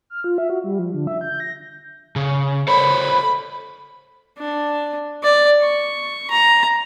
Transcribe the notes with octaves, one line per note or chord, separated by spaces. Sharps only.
F6
F4
E5
F#4
G3
F3
D3
E5
G6
A#6
C#3
A4 C5 C#5 B5
D4
D5
C#6
A#5